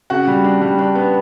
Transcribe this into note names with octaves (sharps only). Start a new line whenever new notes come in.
C#3 F#4 F#5
G3
D4
G3
D4
B3